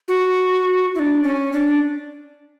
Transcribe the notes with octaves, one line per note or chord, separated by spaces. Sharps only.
F#4
E4
D4
C#4
D4